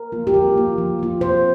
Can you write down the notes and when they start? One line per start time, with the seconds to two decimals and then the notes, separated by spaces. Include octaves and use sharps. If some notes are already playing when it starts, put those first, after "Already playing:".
Already playing: A#4
0.12 F3 A#3 F4
0.27 G4
0.34 F3 A#4
0.56 A#3 F4
0.78 F3
0.99 A#3 F4
1.21 C3 C5